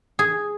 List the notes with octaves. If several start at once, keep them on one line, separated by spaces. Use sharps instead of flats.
G#4